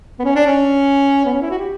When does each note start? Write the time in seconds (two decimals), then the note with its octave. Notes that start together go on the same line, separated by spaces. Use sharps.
0.19 B3
0.24 C#4
0.36 D4
0.46 C#4
1.25 B3
1.34 C#4
1.41 E4
1.50 F#4
1.58 G4